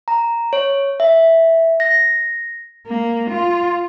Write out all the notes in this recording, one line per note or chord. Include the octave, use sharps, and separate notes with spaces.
A#5
C#5
E5
A#6
A#3
F4